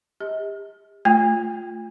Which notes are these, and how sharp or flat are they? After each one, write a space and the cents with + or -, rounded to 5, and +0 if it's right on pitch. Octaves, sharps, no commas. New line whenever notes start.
G4 +40 D#5 +45
A3 +0 F4 +0 G#5 -45